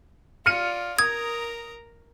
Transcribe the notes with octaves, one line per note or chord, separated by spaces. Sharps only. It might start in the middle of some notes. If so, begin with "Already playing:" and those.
F4 D5 F6 C#7 D#7
A#4 A#5 D#6 G#6